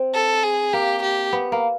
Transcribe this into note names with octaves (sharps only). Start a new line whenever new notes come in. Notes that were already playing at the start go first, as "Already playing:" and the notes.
Already playing: C4
A4
G#4
A#3 G4
G4
B3
A#3